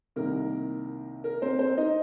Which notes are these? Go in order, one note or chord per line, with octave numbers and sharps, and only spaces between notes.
C2 C3 D#3 A#3 A#4
A#4
C4 C5
C4 C5
D#4 D#5